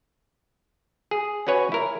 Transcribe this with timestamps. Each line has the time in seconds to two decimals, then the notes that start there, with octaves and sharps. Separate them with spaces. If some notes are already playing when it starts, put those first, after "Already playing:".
1.11 G#4
1.47 C#4 F#4 B4 C#5 G#5
1.72 E4 A#4